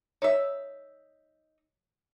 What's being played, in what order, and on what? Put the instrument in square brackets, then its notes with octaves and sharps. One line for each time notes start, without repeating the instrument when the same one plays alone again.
[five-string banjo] D#4 E5 [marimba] C#5